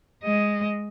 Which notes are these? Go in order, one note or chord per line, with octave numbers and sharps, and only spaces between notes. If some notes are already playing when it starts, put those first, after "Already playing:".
G#3 D#5